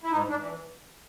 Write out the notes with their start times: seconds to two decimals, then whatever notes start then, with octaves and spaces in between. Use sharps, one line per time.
0.03 E4
0.12 G#2 D#4
0.30 D4
0.39 E3